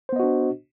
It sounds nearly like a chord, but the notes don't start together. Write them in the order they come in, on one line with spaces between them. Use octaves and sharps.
C5 B3 D#5 F#4 D4